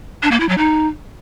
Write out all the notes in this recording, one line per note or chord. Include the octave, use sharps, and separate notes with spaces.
D4
A#3
E4
F#3
D#4